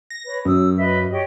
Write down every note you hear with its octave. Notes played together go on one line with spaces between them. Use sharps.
A#6
B4 C#5
F#2 D#6 E6
B4 D#5 E5
G4 C#5 D#5